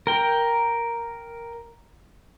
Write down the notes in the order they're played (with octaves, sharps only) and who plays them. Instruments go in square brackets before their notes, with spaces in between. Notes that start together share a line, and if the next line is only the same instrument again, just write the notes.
[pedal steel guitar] A#4 G5